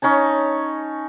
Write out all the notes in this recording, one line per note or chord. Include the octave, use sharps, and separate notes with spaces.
C#4 D#4 C#5 A5